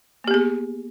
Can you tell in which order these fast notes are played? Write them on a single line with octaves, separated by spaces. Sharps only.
A#3 G4 B3 G#4